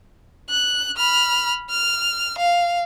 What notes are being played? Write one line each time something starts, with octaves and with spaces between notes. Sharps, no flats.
F#6
B5 F6
F6
F5